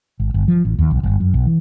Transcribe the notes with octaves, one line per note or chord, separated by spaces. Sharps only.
G#1
G1
F3
A1
D#2
B1
G1
F#2
B1
E3